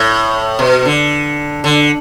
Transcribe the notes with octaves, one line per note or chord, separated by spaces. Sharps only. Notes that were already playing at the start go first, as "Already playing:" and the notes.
Already playing: A2
B2
D3
D3